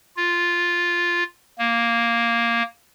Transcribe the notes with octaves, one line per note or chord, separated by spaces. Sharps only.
F4
A#3